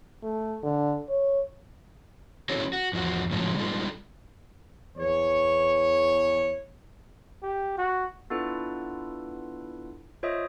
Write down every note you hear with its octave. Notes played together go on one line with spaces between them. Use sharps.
A3
D3
C#5
C#4 E4 F#4 G#4 A4 C#5
F#4
E2 F3 D4 F#4
A2 C#3 F3 F#3 G#3
G3 G#3 B3 D#4 F4 A4
E2 C#5
G4
F#4
B3 D4 E4 F4 A4 B4
F4 C5 C#5 D#5 E5 D#6